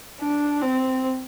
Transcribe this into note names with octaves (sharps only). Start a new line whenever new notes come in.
D4
C4